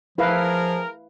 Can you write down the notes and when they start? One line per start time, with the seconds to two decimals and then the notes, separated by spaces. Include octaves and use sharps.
0.18 F3 E4 G#4 A#4 B4 F5